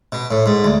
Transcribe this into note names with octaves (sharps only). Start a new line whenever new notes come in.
B2
A2
G#2
D2